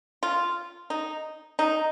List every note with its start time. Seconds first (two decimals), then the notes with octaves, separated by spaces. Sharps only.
0.23 F4
0.90 D#4
1.59 D#4